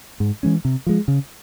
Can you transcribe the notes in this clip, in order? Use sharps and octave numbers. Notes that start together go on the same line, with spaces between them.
G#2
E3 G#3 C#4
C3
F3 G#3
C#3